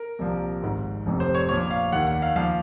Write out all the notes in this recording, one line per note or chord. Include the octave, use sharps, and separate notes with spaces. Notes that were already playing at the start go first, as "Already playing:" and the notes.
Already playing: A#4
C2 A#2 F3
G#1 G#2 D#3
F1 F2 C3
C5
C#5
A#1 A#2 F3 C#5
F5
D#2 D#3 F#5
F#5
F5
A#2 F3 F5